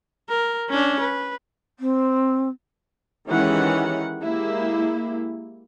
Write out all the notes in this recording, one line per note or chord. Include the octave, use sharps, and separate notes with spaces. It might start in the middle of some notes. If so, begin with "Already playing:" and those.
A#4
C#4 D4
B4
C4
D#3 E3 G#3 C#4 G4 F#5
G#3 A#3 E4 G4